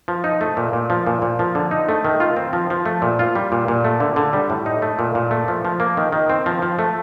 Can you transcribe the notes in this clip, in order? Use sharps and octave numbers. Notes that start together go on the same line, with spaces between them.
F3
D#4
A3
A#2
A#2
F3
A#2
A#2
F3
D3
D#4
A3
D#3
F4
C4
F3
F3
A3
A#2
F4
G3
A#2
A#2
A3
D3
D3
G3
A2
D#4
A3
A#2
A#2
A3
F3
F3
A#3
D#3
D#3
C4
F3
F3
A3